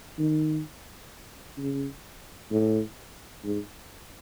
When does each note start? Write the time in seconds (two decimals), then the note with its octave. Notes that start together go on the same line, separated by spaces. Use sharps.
0.18 D#3
1.58 C#3
2.51 A2
3.44 G#2